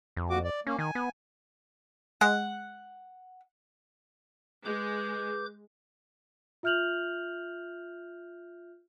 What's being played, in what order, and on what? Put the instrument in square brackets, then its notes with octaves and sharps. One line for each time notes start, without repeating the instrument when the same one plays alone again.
[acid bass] F2
[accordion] D#2 F#4 D6
D5
[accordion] A#3 [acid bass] C#4
[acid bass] D#3 [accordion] G#5
[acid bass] B3
[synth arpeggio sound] G#3 [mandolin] F#5
[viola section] G#3 [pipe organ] B4 D6 G6
[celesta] F4 E5 F6 G6 F7 F#7